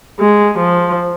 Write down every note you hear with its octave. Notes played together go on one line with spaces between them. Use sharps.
G#3
F3